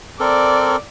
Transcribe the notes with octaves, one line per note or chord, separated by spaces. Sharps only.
C4 A4 A#4 D5